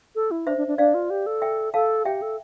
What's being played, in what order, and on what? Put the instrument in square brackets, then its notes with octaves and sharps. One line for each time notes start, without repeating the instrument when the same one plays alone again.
[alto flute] A4
E4
[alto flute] D4 [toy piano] C5 E5
[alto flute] D4
D4
[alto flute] D4 [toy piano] D5 F5
[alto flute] F4
G4
A4
[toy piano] E5 G5
[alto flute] A4 [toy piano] F5 A5
[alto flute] G4 [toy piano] E5 G5
[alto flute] A4